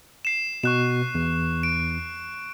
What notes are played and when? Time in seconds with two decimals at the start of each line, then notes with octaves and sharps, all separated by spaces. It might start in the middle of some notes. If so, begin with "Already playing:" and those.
0.25 C7 E7
0.64 B2 C#6 F#6 E7
1.15 E2
1.63 D7